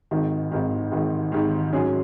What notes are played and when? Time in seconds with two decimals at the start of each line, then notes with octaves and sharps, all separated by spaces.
0.11 G#1 G#2 D#3
0.52 G#1 G#2 D#3
0.92 G#1 G#2 D#3
1.32 G#1 G#2 D#3
1.73 G#2 F#3 C#4 G#4